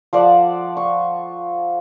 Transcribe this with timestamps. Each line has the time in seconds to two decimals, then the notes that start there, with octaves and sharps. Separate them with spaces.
0.13 F3 A4 D5 F#5
0.77 C#6